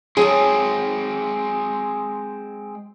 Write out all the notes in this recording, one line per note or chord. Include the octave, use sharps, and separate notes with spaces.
F#3 G#3 C4 D#4 G#4 A4